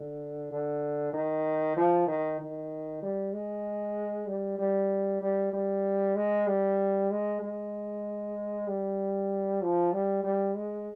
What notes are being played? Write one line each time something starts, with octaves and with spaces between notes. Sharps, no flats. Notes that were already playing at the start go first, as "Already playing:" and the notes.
Already playing: D3
D3
D#3
F3
D#3
D#3
G3
G#3
G3
G3
G3
G3
G#3
G3
G#3
G#3
G3
F3
G3
G3
G#3